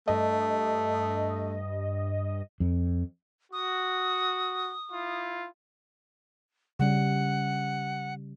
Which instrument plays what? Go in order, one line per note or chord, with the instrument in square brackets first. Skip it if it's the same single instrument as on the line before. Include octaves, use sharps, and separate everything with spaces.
[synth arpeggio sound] G2 D#5 [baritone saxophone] A3
[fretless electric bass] F2
[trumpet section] F#4 [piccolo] D#6
[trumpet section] E4 F4
[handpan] C#3 G3 C#4 [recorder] F#5